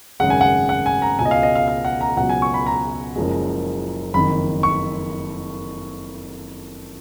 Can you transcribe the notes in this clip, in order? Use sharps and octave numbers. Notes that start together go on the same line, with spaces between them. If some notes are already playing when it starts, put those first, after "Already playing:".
G#1 F#2 C#3 G#3 F#5
G#5
F#5
F#5
G#5
A#5
C#2 B2 G#3 G#5
D#5
F5
D#5
F5
F5
F#5
A#5
C#2 B2 F#3 F#5
G#5
C#6
B5
A#5
F#1 F#2 F3 G#3
F#1 F2 D#3 B5
C#6